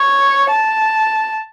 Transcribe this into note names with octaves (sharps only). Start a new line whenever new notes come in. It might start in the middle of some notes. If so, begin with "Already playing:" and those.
Already playing: C#5
A5